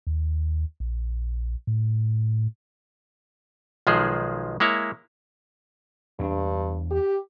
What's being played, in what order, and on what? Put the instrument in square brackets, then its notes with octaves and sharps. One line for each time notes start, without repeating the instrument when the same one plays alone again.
[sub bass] D#2
A#1
A2
[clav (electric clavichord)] B1 D#3 F3 G#3 G#4 C5
G#3 A#3 E4 C#5
[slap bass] E2 C4 D4 [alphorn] G2
[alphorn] G4